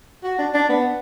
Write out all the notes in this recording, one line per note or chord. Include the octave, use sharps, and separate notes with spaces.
F#4
D4
D4
B3